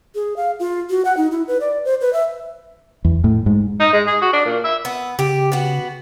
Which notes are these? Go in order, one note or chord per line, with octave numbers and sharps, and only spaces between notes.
G#4
F5
F4
F#4
F#5
D#4
E4
B4
D5
C5
B4
E5
E2
A2
G#2
D#4
G#3
G#4
F#4
D4
A#2
E5
B3
C#3 G4
B3 F#4